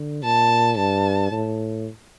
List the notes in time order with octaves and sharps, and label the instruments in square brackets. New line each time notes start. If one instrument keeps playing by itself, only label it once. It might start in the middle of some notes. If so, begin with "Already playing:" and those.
Already playing: [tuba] D3
[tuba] A#2 [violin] A5
[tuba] G2 [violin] A5
[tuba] A2